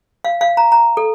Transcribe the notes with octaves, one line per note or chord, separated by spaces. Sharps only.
F5
F5
A#5
A#5
A4